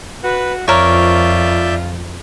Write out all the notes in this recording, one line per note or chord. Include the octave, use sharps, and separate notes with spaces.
F#4 B4
F2 F4 A#4 C#5 D5 E5 G6